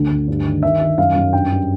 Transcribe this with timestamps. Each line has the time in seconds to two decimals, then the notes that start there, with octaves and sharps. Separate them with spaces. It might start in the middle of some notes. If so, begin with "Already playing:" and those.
Already playing: D2
0.11 D2
0.28 G2
0.45 D#3
0.63 D#3 E5
0.81 D#3
0.98 F#2 F5
1.16 F#2
1.33 G2 G5
1.50 G2